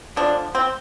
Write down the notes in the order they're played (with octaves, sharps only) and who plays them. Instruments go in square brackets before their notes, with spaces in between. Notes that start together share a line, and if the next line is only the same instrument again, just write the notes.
[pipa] D3 F3 G#3 D4
C4